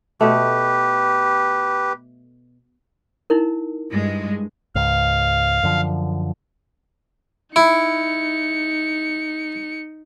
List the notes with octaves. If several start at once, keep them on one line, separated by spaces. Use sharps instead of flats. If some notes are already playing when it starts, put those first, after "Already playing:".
B2 A3 G4 B4
D#4 E4 A#4
G2 G#3
C#2 G#2 F5
F#2 D3 F3
D#4 E4 C#7